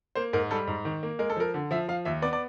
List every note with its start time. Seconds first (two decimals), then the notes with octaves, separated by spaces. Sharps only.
0.15 A#3 C5
0.33 G#2 A#4
0.51 G3 A4
0.67 G#2
0.85 D#3
1.03 A#3
1.19 G#3 A#4
1.30 A4
1.36 F3 A#4
1.54 D3
1.71 F3 E5
1.88 F3 F5
2.05 D#2 E5
2.22 B3 D5
2.33 D5